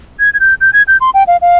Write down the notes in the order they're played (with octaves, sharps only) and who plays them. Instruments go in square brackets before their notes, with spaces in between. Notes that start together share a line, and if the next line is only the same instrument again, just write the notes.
[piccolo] G#6
G#6
G6
G6
G#6
G6
C6
G5
F5
F5